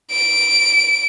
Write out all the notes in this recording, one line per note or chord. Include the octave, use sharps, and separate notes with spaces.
D7